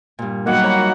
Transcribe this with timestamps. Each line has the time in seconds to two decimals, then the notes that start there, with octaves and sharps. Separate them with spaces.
0.19 G2 A#2
0.46 D#3 F#3 G3 A#3 B3 F#5
0.63 C#5 A#5 B5
0.76 D#4 F4